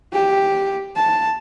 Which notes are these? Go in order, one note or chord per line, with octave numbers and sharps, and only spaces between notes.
G4
A5